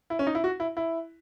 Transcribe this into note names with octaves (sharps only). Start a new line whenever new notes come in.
E4
C#4
D#4
E4
F#4
E4
E4